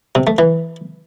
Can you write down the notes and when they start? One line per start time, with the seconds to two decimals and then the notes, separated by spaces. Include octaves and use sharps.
0.15 C3
0.27 A3
0.38 E3